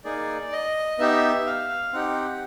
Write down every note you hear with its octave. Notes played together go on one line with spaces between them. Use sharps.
A#3 D#4 G#4 D5
D#5
B3 D#4 G4 E5
F5
C4 D#4 G4 F#5